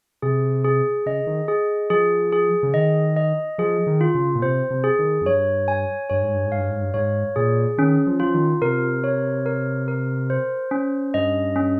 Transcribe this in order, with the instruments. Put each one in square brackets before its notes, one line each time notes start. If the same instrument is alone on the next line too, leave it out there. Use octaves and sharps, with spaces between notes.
[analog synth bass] C3 [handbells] G#4
[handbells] G#4
[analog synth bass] C#3 [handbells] D#5
[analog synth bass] D#3
[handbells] G#4
[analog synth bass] F3 [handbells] G#4
[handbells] G#4
[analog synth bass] C#3
[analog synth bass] D#3 [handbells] D#5
[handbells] D#5
[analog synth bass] F3 [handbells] G#4
[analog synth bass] D#3
[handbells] F4
[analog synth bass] C#3
A#2
[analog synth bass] C3 [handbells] C5
[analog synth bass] C3
[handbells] G#4
[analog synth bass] D#3
F2
[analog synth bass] G2 [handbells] C#5
[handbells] G#5
[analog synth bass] G2 [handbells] C#5
[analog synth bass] G#2
G2
G#2
[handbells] F5
[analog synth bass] G2
G#2
G2
[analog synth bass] G#2 [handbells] C#5
[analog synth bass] A#2 [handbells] G#4
[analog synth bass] D#3 [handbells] C#4
[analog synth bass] F3
[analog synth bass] F3 [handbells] F4
[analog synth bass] D#3
[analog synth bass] C3 [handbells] A#4
[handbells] C#5
A#4
A#4
C5
C#4
[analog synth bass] G2 [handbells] D#5
[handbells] C#4